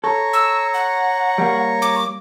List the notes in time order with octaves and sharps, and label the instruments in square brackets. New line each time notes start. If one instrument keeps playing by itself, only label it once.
[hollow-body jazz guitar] A4 [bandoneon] C#5 A#5 C#6
[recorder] E6
F#5
[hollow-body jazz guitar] G3 A#3
[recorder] D6